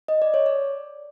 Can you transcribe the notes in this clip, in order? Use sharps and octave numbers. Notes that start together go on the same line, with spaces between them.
D#5
D5
C#5
D5